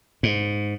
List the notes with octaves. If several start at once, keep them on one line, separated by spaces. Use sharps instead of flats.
G#2